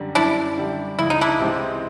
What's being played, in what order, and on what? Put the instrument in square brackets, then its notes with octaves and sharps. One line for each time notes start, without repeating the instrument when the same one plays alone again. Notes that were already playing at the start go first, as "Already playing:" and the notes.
Already playing: [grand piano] F#2 D3 G3
[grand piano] F#2 [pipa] D4 E4
[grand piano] D3 G3
[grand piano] C#2 [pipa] E4
[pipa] D#4
D4 E4
[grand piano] C3 E3 G#3 C4